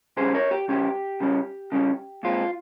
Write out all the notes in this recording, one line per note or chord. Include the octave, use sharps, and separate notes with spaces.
C#3 G3 C#4 G#4 C5
A#4 C#5
G4
C#3 G3 C#4 G4
C#3 G3 C#4
C#3 G3 C#4
A#2 G#3 C4 F4